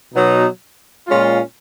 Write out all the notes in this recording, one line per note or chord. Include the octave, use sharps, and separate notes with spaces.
B2 F#3 B3 D#4
A#2 G#3 C#4 F4